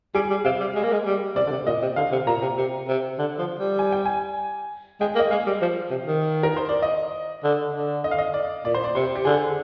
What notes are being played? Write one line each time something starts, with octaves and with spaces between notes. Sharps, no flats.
G3 G#4
G3
C3 F5
G3
G#3
A#3
G#3
G3
C3 D5
D3
C3
A#2 D#5
C3
D3 F5
C3
A#2 A#5
C3
C3
C3
D3
F3
G3
G#5
G5
G#5
G#3 G5
A#3
D#5
G#3 F5
G3
F3
C3
D#3
A#4
C5
D5
D#5
D3
D3
D#5
F5
D#5
D5
A#2 D5
C5
D5
C3 C5
G4
D3 G#4